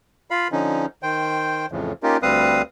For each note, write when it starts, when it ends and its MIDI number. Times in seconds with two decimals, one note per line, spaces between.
0.31 0.48 65
0.31 0.48 77
0.31 0.48 83
0.52 0.86 50
0.52 0.86 53
0.52 0.86 61
0.52 0.86 63
1.03 1.66 51
1.03 1.66 72
1.03 1.66 79
1.72 1.92 41
1.72 1.92 45
1.72 1.92 49
1.72 1.92 52
1.72 1.92 53
2.03 2.17 58
2.03 2.17 61
2.03 2.17 63
2.03 2.17 65
2.03 2.17 67
2.03 2.17 70
2.22 2.62 38
2.22 2.62 55
2.22 2.62 60
2.22 2.62 71
2.22 2.62 77
2.22 2.62 87